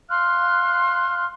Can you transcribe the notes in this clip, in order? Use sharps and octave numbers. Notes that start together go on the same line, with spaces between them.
F5 C6 F6 F#6